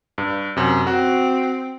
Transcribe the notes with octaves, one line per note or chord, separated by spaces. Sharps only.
G2
F#2 C3
C4 F#4